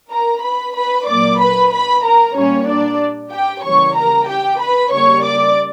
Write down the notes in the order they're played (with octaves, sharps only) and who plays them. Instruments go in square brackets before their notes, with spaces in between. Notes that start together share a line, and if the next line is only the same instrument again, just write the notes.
[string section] A#4 A#5
B4 B5
B4 B5
A#2 F#3 A#3 D5 D6
B4 B5
B4 B5
A#4 A#5
A#2 G3 A#3 C#4 C#5
D4 D5
G4 G5
C#3 E3 G3 A#3 C#5 C#6
A#4 A#5
G4 G5
B4 B5
C#3 G3 A#3 C#5 C#6
D5 D6